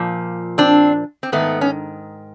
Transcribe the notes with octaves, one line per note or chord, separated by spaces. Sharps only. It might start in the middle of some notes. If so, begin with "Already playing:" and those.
Already playing: A#2 F3
C4 D4
C4
G#2 D#3 A3 B3
C#4